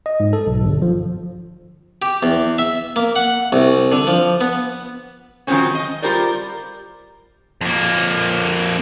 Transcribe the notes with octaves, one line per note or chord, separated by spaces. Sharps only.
D#5
G#2
A4
B1
G1
F3
G4
E2
E5
A#3
F#5
C2
D3
F3
B3
D#3 F3 F#3 G#3 C4 C#4
D#5
G3 F4 G4 A#4 C5 D5
F2 A#3